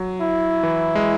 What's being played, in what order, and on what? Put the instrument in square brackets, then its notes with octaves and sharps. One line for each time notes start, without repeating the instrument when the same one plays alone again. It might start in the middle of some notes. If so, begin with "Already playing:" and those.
Already playing: [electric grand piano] F#3
[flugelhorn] E4
[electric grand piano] E3
G#3